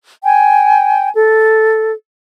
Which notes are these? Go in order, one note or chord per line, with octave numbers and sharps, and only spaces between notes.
G5 G#5
A4